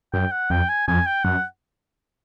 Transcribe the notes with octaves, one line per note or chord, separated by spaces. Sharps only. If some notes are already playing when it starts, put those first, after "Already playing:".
F#2 G5
F#5
F2 G5
G#5
F2 G#5
G5
F#2 F#5